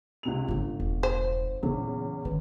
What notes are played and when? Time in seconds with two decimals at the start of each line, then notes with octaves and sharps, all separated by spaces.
0.23 C#2 C3 F7
0.48 G1 G#2 C#3
0.80 E1
1.03 C5
1.63 E2 A#2 C#3 F#3
2.25 D#3 G3 B4